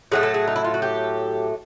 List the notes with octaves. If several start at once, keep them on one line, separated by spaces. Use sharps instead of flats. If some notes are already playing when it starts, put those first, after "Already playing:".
A2 F#3 A3 G#4
A4
G#4
D#4
E4
F4
F#4
G4